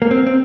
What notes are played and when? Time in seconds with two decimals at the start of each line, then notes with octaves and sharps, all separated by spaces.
0.02 A#3
0.11 C4
0.27 C4